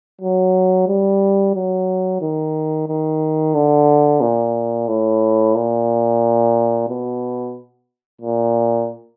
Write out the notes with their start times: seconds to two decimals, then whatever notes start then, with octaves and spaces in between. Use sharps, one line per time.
0.21 F#3
0.88 G3
1.55 F#3
2.22 D#3
2.89 D#3
3.55 D3
4.21 A#2
4.88 A2
5.55 A#2
6.88 B2
8.21 A#2